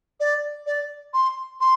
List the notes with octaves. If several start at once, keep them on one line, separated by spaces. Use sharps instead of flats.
D5
D5
C6
C6